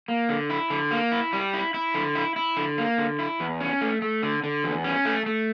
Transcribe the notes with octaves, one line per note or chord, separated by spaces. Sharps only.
A#3
D3
E4
D3
A#3
E4
G3
E4
E4
D3
E4
E4
D3
A#3
D3
E4
E2
C#4
A3
A3
D3
D3
E2
C#4
A3
A3